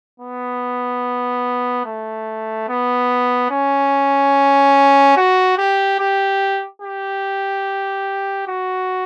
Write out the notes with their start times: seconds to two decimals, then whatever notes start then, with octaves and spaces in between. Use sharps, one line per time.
0.20 B3
1.85 A3
2.68 B3
3.51 C#4
5.17 F#4
5.58 G4
6.00 G4
6.82 G4
8.48 F#4